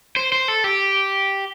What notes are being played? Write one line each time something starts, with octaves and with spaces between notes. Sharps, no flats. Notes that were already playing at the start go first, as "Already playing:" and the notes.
C5
C5
A4
G4